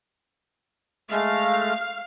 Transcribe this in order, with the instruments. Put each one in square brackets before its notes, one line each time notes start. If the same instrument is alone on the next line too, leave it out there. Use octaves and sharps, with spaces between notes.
[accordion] G#3 A3 [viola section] F5